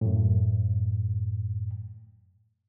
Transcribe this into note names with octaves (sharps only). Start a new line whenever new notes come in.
F#2 A2